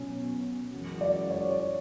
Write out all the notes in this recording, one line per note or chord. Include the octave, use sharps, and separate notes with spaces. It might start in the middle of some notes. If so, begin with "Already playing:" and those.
Already playing: B2 F#3 C#4
F#2 E3 G#3 C#4 F#4
D5
C#5
C#5